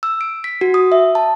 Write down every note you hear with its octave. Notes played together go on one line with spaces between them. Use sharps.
E6
D7
B6
F#4
D#6
E5
A5